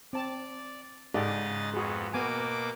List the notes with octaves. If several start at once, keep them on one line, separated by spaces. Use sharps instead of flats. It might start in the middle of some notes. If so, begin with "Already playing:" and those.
C4 D5 A5
G#2 C#3 G4 A4 D5 D#5 A6
F2 B3 F#4 G#4
B2 A#3 B3 G#5 D6